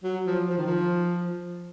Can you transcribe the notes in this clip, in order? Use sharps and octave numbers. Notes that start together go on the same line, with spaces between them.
F#3
F3
F3
D#3
F3